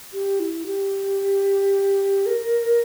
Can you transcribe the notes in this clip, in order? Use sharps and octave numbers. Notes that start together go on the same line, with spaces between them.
G4
E4
G4
A#4